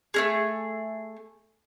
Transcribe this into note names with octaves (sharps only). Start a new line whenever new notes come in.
A3 C#4 G#4